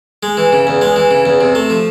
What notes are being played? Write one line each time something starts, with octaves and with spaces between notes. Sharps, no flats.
G#3
E3
C#3
E2
G#3
E3
C#3
E2
C3
A3
F3